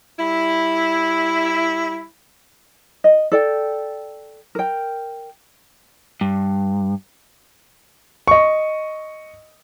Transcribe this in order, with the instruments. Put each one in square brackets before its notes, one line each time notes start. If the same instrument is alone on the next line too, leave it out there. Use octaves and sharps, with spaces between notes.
[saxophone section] G3 E4
[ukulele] D#5
A4 D5 G5
A#4 G5
[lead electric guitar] G2
[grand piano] D#5 C#6